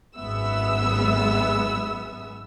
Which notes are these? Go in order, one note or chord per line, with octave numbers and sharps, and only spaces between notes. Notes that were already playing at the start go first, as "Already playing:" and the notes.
G#1 F#2 G#3 B3 E5 E6